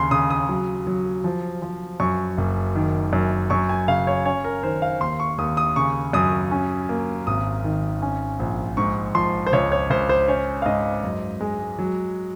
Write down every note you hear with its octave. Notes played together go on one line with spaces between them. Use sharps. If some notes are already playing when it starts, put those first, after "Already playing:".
Already playing: D#2 C#3 C6
C#3 D#6
D#6
F#3
F#3
F3
F3
F#2 C#6
F#1
D#3
F#2
F#2 C#6
G#5
C#3 F5
C#5
C#4 C#5
A#4
D#3 C5
F5
D#2 C6
C#6
D#2 D#6
D#6
C#3 C#6
F#2 D#6
C#4
A#3
G#1 D#6
D#3
C#4
A#1
G#2 C#6
F3 C6
C5
C#2 C#5
C#5
C#2 C5
C5
C#4 C#5
F5
G#2 D#5
F#2
G#3
F#3